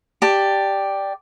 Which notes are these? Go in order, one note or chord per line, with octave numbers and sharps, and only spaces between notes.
G4 D5 A5